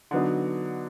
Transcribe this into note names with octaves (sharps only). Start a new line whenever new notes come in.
D3 F#3 B3 D#4